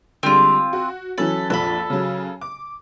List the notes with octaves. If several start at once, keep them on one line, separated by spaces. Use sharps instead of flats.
D3 G3 G#3 C4 F4
F#4
E3 F#3 C#4 A4 B5
A#1 F2 A4 B5
C#3 F#3
D6